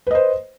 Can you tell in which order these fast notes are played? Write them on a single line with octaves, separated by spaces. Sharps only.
B4 D#5 C5